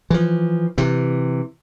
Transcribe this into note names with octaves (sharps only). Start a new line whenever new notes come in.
E3 F3
C3 E3